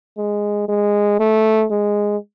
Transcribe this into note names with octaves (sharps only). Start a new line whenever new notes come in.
G#3
G#3
A3
G#3